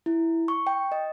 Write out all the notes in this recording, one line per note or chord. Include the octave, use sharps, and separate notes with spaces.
E4
C#6
G5
D#5